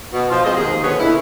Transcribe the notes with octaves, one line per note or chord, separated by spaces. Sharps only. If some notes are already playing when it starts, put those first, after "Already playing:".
B2
F3 F4
G#3 C4 F#4 C5 D#5
D#2 G#2 G#4
B2 D3 G#3 B3 C#4 C#5
A#2 D3 D#3 E4